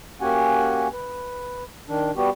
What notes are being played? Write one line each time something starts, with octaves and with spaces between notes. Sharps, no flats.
A#3 C#4 F#4 G4 F#5 G#5
B4
D#3 D4
G3 B3 F#4 G4